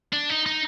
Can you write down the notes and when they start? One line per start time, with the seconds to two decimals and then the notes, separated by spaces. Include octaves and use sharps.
0.13 D4
0.30 D#4
0.46 D#4